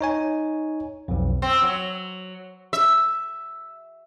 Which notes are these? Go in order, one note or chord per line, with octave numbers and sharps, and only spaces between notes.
D#4 C#5 G#5
B1 F2
C4
F#3
E5